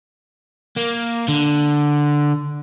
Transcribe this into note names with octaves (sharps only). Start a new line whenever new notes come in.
A#3
D3